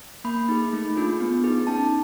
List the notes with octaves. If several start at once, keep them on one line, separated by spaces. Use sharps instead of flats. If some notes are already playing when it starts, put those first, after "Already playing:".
A#3 B5
D#4 G#4
A3
D4 F4 G#4
B3
D#4 G#4
C#4 A5